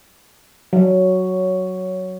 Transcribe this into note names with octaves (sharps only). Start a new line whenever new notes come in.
F#3